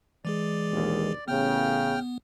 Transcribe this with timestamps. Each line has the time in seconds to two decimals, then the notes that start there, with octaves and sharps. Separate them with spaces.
0.25 E3 G#3 G#4 D5
0.71 A#1 D#2 B2
1.28 A1 C#3 B3 G5 F6